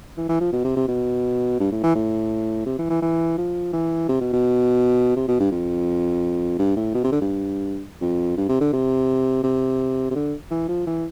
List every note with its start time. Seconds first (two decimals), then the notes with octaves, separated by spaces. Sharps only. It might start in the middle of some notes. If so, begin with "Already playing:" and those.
0.17 E3
0.29 E3
0.41 F3
0.53 B2
0.64 C3
0.76 C3
0.88 B2
1.60 G2
1.71 A2
1.83 E3
1.95 A2
2.66 C3
2.78 E3
2.90 E3
3.02 E3
3.38 F3
3.73 E3
4.08 C3
4.21 B2
4.33 B2
5.16 C3
5.28 B2
5.39 G2
5.51 F2
6.59 G2
6.76 A2
6.94 B2
7.04 C3
7.12 D3
7.21 G2
8.01 F2
8.37 G2
8.49 C3
8.61 D3
8.73 C3
9.43 C3
10.11 C3
10.15 D3
10.51 E3
10.68 F3
10.87 E3